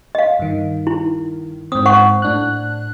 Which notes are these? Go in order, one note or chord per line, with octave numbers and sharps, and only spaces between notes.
D#5 F5
G2 D#3
E4
G#2 C4 D#6
C5 F#5 C#6
A2 D4 F#6